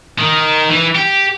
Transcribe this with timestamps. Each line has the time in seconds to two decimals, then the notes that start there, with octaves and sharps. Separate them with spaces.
0.18 D#3
0.70 E3
0.95 G4